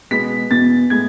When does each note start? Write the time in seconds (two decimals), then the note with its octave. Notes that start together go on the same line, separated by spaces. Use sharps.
0.11 B2 G#3 B3 B6
0.50 E2 B2 B3 A6
0.90 A2 G#3 B3 G#6